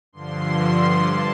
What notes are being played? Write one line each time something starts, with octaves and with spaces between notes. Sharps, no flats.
G2 D3 F3 C6
G2 A5